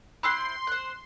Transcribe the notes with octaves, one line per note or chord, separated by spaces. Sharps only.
C4 E4 B5 C6 E6 F#6 C7
C5 F#6